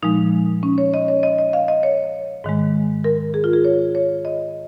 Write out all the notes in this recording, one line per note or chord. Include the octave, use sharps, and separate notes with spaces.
A#2 F3 G#3 D#4
C#4
C#5
D#5
C#5
D#5
D#5
F5
D#5
C#5
G#2 D#3 G#3
A#4
G#4
F4
G#4
C#5
C#5
D#5